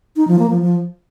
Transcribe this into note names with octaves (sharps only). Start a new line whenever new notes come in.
D#4
F3
A#3
F3
F3